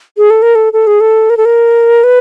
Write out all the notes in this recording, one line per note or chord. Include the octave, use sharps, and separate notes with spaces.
G#4
A4
A#4
A4
A4
G#4
A4
A#4
A4
A#4
B4